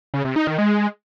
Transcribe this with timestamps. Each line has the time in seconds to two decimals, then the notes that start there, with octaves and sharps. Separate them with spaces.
0.14 C#3
0.25 C3
0.36 D#4
0.47 D#3
0.58 G#3